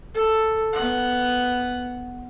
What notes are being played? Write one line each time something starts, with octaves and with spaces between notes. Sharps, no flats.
A4
B3 F#5